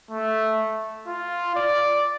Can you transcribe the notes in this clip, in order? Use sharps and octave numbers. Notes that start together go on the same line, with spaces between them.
A3
F4
D5